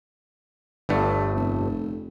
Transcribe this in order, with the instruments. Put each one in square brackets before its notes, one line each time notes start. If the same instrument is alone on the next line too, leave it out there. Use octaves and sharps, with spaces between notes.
[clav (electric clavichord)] G1 G2 A3 [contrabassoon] D3
[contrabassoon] F1